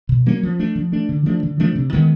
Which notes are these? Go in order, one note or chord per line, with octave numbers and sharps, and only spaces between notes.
B2
F#3 A#3 C#4
F3
A3 D4
F3
A3 D4
D3
F3 A3 D4
D3
F3 A3 D4
C3
D#3 G#3 B3